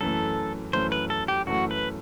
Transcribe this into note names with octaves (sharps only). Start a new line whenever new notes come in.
F#2 E3 A3 A4
F#2 E3 A3 C5
B4
A4
G4
F#2 E3 A3 F#4
B4